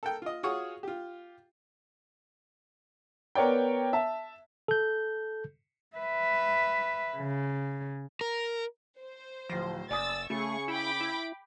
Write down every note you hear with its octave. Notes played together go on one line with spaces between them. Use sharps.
A4 A#4 G5
F4 D#5
F4 F#4 G#4 C#5 C#6 D#6
F4 G4
B3 A#4 C#5 D5 G5
E5 A5
A4 G6
B4 E5
C#3
A#4
C5
D1 F3 A#6
F#1 D5 G#5 D#6 E6 A6
C#3 A3 G#4 C#6
E4 G5 B5 D6
E4